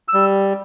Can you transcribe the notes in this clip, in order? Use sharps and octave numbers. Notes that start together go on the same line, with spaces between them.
E6
G3